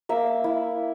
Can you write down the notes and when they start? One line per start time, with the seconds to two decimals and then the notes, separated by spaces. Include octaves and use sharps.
0.09 A#3 E5
0.44 E4